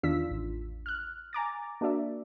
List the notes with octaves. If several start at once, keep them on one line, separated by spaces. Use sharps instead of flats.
E2 D#3 D4 F4 E6 B6
A1
F6 F#6
G#5 A#5 D6 A6
A#3 D4 F#4 D5 E5